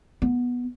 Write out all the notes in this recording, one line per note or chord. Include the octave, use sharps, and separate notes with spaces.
B3